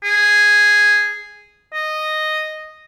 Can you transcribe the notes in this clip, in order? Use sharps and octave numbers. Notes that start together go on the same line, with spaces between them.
G#4
D#5